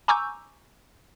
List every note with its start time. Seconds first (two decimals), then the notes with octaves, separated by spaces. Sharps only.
0.08 G#5 A#5 C#6 D6 E6 G6